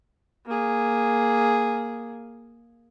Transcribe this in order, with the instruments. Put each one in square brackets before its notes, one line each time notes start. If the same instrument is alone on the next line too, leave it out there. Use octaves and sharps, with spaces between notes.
[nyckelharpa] A#3 G#4